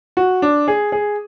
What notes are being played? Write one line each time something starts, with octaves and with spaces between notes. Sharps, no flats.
F#4
D4
G#4
G#4